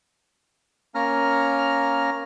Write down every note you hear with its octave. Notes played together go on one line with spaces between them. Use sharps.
A#3 C#4 A#5 F6